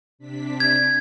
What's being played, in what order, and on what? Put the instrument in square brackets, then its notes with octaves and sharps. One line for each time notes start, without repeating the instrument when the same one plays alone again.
[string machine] C3 D4 B6
[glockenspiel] G#6